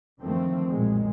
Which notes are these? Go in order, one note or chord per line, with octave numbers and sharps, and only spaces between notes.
F#2 D3 D#3 F3 A3 C4
B1 F#2 A#2 D#3 G#3